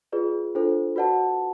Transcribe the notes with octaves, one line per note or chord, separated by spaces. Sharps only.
F4 G#4 B4 D5
D4 F4 A4 C5
F#4 B4 D5 F#5 A5